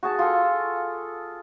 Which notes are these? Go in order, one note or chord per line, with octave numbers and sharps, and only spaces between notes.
F#4 G#4 A5
F4 G#4 A4